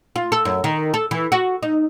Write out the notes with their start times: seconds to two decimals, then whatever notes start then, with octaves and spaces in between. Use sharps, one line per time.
0.16 F4
0.32 A4
0.45 F#2
0.64 D#3
0.94 A4
1.11 E3
1.32 F#4
1.63 D#4